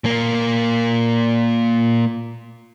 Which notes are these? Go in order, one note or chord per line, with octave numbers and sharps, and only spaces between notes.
A#2 A#3